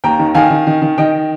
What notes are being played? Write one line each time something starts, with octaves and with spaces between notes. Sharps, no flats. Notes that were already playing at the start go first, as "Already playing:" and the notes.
D#2 G5 A#5
D#3
D#3 F5 G#5
D#3
D#3
D#3
D#3 D#5 G5